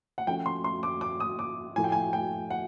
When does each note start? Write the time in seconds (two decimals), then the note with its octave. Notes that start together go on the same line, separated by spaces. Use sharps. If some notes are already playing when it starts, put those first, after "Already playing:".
0.18 F#5
0.27 F3 A3 C#4 G5
0.46 C6
0.64 C6
0.83 D6
1.01 D6
1.20 D#6
1.39 D6
1.76 A2 F3 A3 G#5
1.84 G5
1.92 G#5
2.13 G5
2.50 F#5